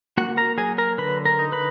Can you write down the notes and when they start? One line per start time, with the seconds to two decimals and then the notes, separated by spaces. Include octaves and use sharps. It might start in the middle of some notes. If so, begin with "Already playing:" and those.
0.18 A#3 F#4 F#5
0.37 A#4 A#5
0.58 F#3 G#4 G#5
0.78 A#4 A#5
0.98 D3 B4 B5
1.25 A#4 A#5
1.39 D#4
1.52 B4 B5